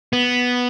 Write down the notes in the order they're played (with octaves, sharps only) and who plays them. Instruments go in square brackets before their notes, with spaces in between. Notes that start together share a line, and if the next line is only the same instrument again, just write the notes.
[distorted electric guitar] B3